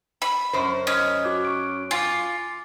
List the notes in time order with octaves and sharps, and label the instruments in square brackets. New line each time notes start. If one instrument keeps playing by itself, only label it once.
[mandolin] B5
[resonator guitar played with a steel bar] F#2 C5
[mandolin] C#4 [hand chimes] D#5 D#6
[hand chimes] F#4 D6 F#6
C#6 D7
[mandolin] F4 [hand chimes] G#5 D6